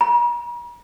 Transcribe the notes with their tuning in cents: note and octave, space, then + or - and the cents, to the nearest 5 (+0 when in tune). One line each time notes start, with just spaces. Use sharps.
A#5 +45